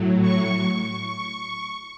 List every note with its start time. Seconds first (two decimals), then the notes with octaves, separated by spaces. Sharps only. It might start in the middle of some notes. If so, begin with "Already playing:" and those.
Already playing: A2 F#3
0.22 C#6
0.73 C#6